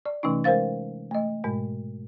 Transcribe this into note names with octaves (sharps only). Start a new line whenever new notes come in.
D5
C3 E3 A3 C#4 D#4
G#3 A#4 C5 F5 A6
A3 D#5
G#2 B2 G#3